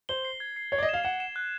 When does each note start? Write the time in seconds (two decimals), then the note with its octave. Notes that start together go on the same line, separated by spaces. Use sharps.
0.09 C5 G7
0.25 C7
0.40 G#6
0.56 C7
0.72 C#5 G#6
0.78 D5
0.83 D#5
0.89 F5 E7
1.04 F#5 E7
1.20 E7
1.36 F#6